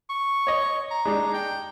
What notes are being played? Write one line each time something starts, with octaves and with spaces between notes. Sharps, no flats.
C#6
C#5 D#5
A#5
G#3 D4 D#4
G5